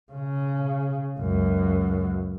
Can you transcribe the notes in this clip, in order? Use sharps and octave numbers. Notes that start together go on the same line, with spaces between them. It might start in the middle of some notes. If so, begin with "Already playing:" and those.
C#3
C#2 F#2